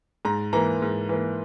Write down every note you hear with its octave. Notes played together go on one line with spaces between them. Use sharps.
G#2 A#5
E3 A#3 A#5
G#2
E3 A#3